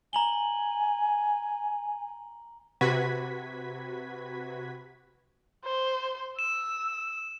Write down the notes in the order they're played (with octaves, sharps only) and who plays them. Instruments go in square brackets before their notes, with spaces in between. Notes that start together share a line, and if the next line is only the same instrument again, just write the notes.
[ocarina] G#5 [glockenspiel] A#5 F#7 G7
[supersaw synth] C3 F#4 B4 G#6 B6
[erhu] C5
[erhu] E6 [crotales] E7